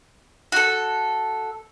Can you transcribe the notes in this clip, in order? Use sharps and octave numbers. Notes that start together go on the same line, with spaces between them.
F#4 A4